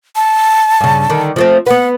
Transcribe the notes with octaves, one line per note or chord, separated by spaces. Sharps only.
A5
G2 C#3
D3 D#3
F3 A3 C4
B3 B4 F#5